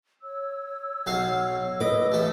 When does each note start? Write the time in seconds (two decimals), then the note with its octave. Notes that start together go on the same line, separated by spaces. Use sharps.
0.22 C#5 E6
1.06 B1 F#4 F5
1.80 B4 D#5 D6
2.12 A1 A3 A4